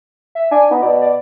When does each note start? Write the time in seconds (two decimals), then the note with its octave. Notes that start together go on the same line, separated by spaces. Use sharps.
0.35 E5
0.51 D4 G#5
0.71 B3 D#4
0.82 B2 D5
1.01 D5